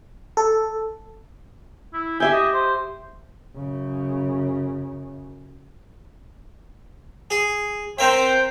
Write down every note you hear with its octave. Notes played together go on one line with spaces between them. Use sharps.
A4
E4
G4 E5 G5 G#5
D#5
C5
F#2 C#3
G#4
C4 A#4 C5 E5 G5